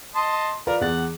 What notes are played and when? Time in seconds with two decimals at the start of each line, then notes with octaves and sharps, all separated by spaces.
0.15 D#5 A5 C6
0.67 F4 A#4 B4 D5
0.81 E2 F#5 A6